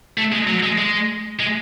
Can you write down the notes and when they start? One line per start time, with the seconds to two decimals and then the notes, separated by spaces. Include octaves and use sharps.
0.18 A3
0.32 G#3
0.47 F#3
0.63 G#3
0.78 G#3
1.39 G#3